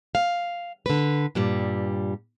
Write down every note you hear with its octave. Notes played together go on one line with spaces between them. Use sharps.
F5
D3 B4
G2 A#2 G3